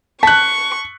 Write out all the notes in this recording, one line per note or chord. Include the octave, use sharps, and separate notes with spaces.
A5 C#6 F#6 B6